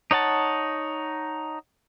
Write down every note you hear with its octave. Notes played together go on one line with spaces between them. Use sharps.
D#4 C#5 F#5 A5